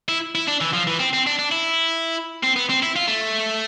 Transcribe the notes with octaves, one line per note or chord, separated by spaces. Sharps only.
E4
E4
D4
E3
F3
E3
C4
C4
D4
D4
E4
C4
B3
C4
E4
F4
A3